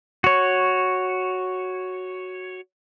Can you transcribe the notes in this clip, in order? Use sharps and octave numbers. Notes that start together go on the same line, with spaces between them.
F#4 C#5